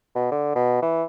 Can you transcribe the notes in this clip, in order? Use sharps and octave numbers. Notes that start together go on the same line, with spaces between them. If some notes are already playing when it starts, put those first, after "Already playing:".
B2
D3
B2
E3